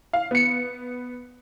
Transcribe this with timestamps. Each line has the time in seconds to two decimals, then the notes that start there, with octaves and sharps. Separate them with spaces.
0.13 F5
0.31 B3 C#7